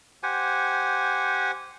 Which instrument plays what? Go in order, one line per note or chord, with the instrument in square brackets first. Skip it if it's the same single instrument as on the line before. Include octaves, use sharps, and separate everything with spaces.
[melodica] G4 C5 F#5 G#5